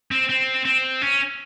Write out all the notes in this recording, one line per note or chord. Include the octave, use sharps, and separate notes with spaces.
C4
C4
C4
C#4